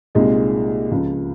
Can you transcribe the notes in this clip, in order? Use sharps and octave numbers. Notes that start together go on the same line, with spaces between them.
C2 A#2 G#3 D#4
C#2 C#3 F3